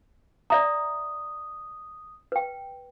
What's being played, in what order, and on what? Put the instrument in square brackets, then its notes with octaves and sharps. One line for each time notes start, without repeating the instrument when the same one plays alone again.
[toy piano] D5 E5 A#5 [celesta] D#6
[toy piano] B4 G5